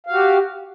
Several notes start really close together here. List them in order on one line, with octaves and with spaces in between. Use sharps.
F5 F#4 G4